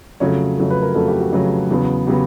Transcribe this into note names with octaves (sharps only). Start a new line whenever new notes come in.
F2 C#3 F#3 A3 C#5
F2 C#3 F#3 A3
B4
A#4
F2 C#3 F#3 A3 A4
G4
F#4
F2 C#3 F#3 A3
E2 C#3 F#3 B3
C#3 F#3 B3 G4